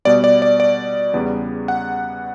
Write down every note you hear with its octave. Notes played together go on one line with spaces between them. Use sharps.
B2 G3 B3 D5
D5
D5
D5
E2 C#3 G3 B3
F#5